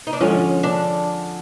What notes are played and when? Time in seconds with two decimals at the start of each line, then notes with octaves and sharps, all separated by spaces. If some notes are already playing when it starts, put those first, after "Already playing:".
0.07 D#4
0.13 D4
0.20 D3 F3 G#3 C#4
0.63 D4